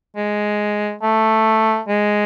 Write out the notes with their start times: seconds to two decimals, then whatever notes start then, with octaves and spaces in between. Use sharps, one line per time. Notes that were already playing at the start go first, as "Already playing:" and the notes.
0.17 G#3
1.03 A3
1.88 G#3